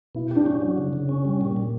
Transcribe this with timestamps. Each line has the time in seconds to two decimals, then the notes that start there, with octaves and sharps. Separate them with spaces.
0.15 B2 E4
0.31 G4
0.36 D4
0.46 C#4
0.62 F#3
0.78 C#3
0.93 C#3
1.09 C#4
1.25 G3
1.41 A#2
1.56 A#2